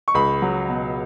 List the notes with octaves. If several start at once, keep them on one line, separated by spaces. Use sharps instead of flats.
C#6
C#2 B5
F#3
B2